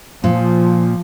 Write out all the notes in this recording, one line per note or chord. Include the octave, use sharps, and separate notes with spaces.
A#2 F3